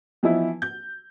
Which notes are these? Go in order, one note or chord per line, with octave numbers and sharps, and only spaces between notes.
E3 F3 B3 D#4 E4
G6